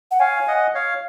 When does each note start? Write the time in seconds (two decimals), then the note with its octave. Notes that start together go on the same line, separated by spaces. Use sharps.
0.11 F#5
0.20 C#5 F5 G#5
0.48 D#5 F#5
0.74 C#5 F5